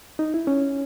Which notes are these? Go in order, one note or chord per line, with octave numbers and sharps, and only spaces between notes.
D#4
E4
C#4